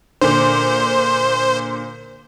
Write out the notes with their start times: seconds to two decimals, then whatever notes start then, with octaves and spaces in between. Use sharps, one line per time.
0.21 A#2 D3 C5